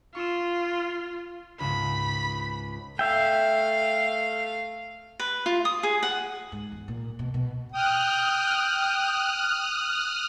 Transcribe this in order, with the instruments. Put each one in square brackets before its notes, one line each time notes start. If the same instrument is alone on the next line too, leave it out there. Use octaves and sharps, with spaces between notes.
[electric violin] F4 [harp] C#6 E6
[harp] C#2 G#2 [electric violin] B5
[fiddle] A3 F5 [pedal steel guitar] E5 G5
[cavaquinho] B4
F4
D#6
G#4
F#5
[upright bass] G#2
E2
A#2
B2
B2
[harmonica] G5 [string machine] D#6 F6 F#6